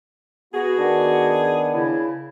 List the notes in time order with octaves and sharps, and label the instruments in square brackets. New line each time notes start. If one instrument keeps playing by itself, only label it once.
[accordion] B3 [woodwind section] F#4 [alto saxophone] G#4
[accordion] D#3 B3 D4
[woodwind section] C#3 E4